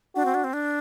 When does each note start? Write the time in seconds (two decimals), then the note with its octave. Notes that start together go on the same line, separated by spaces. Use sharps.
0.16 D4 F#4
0.25 C4
0.34 D4
0.44 C4
0.53 D4